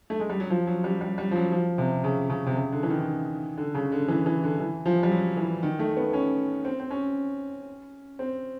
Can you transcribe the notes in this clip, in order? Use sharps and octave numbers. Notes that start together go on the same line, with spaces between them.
A3
G#3
G3
F#3
F3
F#3
G3
G3
G3
F3
F#3
F3
C3
C#3
C#3
C3
C#3
D3
E3
D#3
D3
C#3
D3
E3
E3
D3
E3
F3
G3
F#3
E3
D#3
A3
B3
C#4
C4
C4
C#4
C4